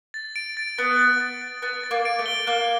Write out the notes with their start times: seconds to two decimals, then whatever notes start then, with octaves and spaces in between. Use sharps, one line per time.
0.14 A6
0.36 D7
0.57 A6
0.78 B3 A6
0.99 A6
1.20 A6
1.42 A6
1.62 B3 A6
1.84 A6
1.91 A#3
2.05 D7
2.19 A3
2.26 G7
2.47 A#3 F#6